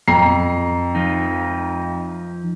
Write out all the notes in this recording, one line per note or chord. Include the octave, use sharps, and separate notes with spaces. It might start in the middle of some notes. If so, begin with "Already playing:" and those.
F2 A#5 C7
F3 D#4